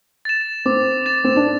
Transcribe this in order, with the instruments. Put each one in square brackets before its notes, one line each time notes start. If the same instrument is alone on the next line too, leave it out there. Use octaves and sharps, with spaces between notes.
[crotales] A6 E7
[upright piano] C4 [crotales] D6
[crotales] A6 E7
[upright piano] C4
D4